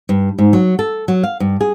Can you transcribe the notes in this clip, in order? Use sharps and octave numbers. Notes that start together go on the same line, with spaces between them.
G2
G#2
F#3
A4
F#3
F5
G2
G#4